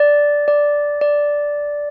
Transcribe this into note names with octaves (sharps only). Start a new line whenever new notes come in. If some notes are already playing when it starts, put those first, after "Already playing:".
Already playing: D5
D5
D5